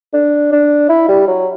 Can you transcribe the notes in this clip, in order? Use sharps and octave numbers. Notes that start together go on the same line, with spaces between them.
D4
D4
E4
G3
F#3